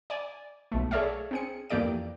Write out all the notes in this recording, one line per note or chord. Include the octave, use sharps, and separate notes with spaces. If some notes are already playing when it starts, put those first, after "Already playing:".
D5 G#5
B1 A3
G#4 A4 C#5 D5 E5 F5
C4 G#4 C#7
F2 E3 A#3 G4 D5 D7